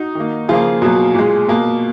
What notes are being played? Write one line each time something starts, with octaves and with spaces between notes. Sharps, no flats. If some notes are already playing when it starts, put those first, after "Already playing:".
Already playing: D#4 F#4
D#3 A#3
C#3 F3 A#3 F4 G#4
B2 F#3 A#3
A#2 G#3
B2 A#3